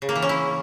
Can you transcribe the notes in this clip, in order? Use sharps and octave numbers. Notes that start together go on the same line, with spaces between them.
C#3
A#3
E3
C#4
E4